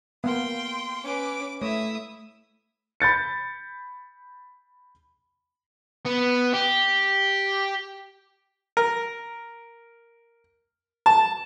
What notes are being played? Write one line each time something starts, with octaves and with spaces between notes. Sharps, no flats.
A#3 B3 F5 G5 C6
C#4 B4 D6
A3 E4 C#5 E5 D#6
B5 G6 A6 C#7
B3
G4
A#4
A5